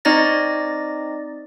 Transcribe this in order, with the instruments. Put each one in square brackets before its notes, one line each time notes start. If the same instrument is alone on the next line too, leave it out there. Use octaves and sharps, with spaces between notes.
[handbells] C4 D#4 D5 D#5 A6 A#6